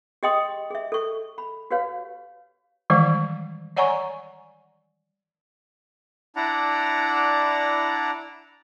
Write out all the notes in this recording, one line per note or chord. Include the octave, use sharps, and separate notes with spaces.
G4 G#4 D#5 G5 C6 D#6
G#4 D#5 E5
A4 C#6
B5
F#4 G4 B4 C#5 F5
D#3 E3 G3 G#3 D5
C#5 D5 F#5 G#5 A#5 C#6
D4 E4 D5 F#5 A#5